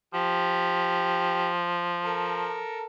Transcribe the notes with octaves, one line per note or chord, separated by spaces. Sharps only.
F3 G4
A4 A#4